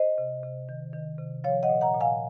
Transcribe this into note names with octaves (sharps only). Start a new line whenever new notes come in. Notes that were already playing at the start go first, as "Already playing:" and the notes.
Already playing: C5 D#5
C3
C3
D#3
D#3
C3
F3 C#5 F5
D#5 F#5
A#2
F#5 A#5
A#2
F5 G#5